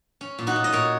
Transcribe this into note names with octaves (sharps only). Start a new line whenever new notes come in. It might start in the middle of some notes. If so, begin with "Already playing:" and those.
C#4
A#2
D#4 F#4
A#2
D#5
A#2 A#4 C#5